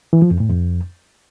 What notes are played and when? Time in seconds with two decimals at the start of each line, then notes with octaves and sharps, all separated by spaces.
0.13 E3
0.22 F3
0.31 F2
0.40 A2
0.49 F2